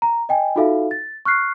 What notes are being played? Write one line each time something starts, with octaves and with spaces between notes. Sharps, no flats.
A#5
D#5 G5 G#5
D#4 F4 F#4 A4 E5 F5
A6
C#6 F6 F#6 C7